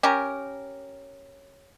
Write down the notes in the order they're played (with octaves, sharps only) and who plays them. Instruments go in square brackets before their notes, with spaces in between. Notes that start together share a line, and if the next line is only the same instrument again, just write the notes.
[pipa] C#4 G4 A#4